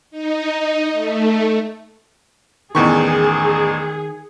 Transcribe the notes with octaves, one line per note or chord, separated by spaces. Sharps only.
D#4
A3
A1 E2 D#3 G#4 C#6